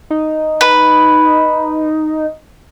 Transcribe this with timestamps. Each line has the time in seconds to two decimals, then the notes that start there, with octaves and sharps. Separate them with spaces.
0.10 D#4
0.61 B4